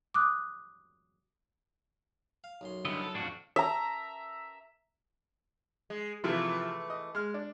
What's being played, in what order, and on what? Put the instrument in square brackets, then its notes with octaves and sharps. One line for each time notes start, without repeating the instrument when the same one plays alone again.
[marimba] D6 D#6 F#6
[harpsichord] F5
B1 F#2 C6
[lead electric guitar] G2 D3 [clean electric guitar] B3 E4 D#5
[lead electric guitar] A4
[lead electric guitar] F2 A2 [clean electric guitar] D4 F#4
[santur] E5 A#5
[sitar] G#3
[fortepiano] C3 F3 E4 [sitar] E3 A3
[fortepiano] D#5
G#3 F6
D4